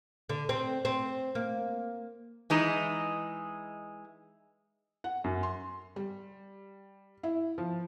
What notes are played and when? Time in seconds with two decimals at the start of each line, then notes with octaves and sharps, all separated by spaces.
0.29 D3
0.49 C4
0.85 C4
1.35 A#3
2.50 E3 G#3 D#4
5.04 F#5
5.24 F#2
5.43 C6
5.96 G3
7.23 E4
7.58 F3